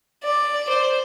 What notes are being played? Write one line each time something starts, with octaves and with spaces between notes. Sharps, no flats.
D5
C5